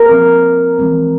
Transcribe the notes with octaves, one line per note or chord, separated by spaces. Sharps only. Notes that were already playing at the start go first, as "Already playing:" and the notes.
Already playing: A#4
F3 C4
E3 G#3 C4